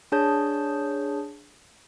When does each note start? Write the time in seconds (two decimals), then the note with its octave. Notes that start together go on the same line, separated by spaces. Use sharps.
0.12 D4 G#4 C#5 A5 G6